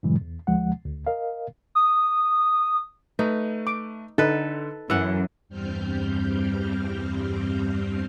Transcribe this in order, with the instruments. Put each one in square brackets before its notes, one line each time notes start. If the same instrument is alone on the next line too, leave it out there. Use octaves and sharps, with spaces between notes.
[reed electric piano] G2 A#2 C#3 E3 F#3 G#3
E2
D2 F3 G#3 F#5
D2
A#4 D#5 F5
[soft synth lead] D#6
[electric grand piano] A3 B4 [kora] D#4
[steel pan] D6
[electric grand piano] D3 [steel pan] D#4 [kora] A4 B4
[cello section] F#2 [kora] E3 F#5 [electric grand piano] E6
[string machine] E2 G2 G3 C4 F6 G6